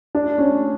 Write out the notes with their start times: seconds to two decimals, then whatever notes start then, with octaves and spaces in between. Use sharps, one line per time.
0.15 D4
0.38 C#4